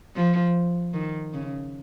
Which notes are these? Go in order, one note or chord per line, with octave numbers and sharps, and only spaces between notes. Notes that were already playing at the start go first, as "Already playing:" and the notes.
F3
D#3
C#3